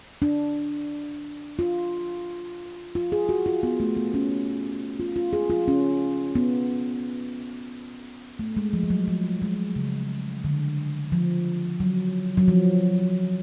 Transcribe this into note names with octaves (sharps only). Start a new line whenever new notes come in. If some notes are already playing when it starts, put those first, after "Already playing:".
D4
F4
F4
G#4
F#4
F4
B3
A3
B3
C#4
F4
F4
G#4
F4
C#4
B3
A3
G#3
F3
F3
F#3
F3
G#3
C#3
D3
F3
F#3
F#3
F3